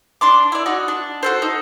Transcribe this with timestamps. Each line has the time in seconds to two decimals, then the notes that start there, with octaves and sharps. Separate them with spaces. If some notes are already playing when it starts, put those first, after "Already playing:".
0.21 D4 C6 D6
0.52 E4 D5
0.66 D#4 F#4 D5
0.88 D4
1.23 F#4 A4 C5
1.42 D#4